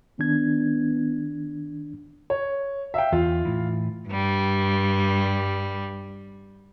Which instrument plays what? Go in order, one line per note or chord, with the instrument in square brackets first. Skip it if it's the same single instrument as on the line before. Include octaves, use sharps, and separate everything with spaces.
[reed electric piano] D#3 D4 G#6 [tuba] B3
[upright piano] C#5
E5 F5 G5
[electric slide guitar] E2 [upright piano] F4 F5
[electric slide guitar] A2 E3
[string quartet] G2 G3